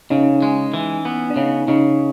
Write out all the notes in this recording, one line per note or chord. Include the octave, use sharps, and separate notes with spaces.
C#3 C#4 D#4
G#3
E3
B3
D4
C#3 C#4 D#4
C#3 C#4 D#4